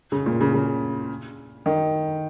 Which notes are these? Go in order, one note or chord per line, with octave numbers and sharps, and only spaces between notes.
C#3
A#2
C#3
C#3
D#3